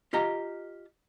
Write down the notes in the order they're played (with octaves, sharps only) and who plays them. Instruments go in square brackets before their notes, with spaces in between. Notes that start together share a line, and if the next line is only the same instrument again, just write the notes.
[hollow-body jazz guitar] F4 G4 D#5 A#5